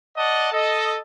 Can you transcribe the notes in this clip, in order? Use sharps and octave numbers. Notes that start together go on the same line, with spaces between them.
D5 D#5 F#5 A5 D#6
A4 D#5